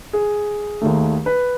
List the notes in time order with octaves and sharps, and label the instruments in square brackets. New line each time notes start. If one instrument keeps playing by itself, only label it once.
[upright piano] G#4
D#2 D#3 A3
B4